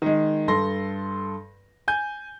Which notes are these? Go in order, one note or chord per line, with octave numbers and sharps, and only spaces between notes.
D#3 G#3
G2 A4 C6 A#6
G#5 G6